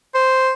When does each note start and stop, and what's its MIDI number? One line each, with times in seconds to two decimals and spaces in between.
0.15 0.52 72